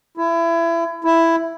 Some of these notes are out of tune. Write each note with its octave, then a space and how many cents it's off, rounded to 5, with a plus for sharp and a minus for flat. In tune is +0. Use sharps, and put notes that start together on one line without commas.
E4 +25
E4 +5